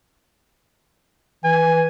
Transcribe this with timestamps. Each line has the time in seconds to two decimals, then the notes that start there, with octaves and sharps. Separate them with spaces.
1.44 E3 G#5